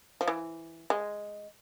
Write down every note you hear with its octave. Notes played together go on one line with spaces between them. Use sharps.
F3
E3
G#3